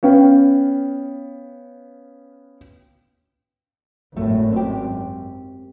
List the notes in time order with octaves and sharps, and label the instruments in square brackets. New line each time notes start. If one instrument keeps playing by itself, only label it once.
[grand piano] B3 C#4 F5 G5
[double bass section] G#1 F#2 [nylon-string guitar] A2 A3
[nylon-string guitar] C4 G4